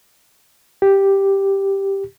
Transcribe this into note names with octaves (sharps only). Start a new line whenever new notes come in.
G4